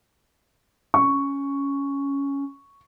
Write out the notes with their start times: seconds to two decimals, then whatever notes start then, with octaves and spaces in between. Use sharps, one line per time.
0.94 C#4 C#6